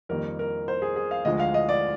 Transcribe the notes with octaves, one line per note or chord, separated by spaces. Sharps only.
F2 D#3 G3 A#3 A#4
A#4
C5
G#4
G#4
F5
D2 D3 F3 G#3 D#5
F5
D#5
D5